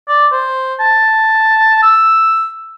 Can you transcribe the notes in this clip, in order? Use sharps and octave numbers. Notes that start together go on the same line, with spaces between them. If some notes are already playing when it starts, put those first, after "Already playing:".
D5
C5
A5
E6